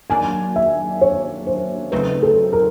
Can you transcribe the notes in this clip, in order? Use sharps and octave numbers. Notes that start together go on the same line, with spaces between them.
D#3 F#3 A#3 D4 G#5
E5
C#5
C5
C#3 F#3 A3 C4 D#4 B4
A4
A#4